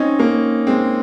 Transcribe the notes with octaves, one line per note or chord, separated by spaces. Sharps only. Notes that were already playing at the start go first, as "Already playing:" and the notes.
Already playing: C4 C#4 D#4
A#3 C#4
G#3 C4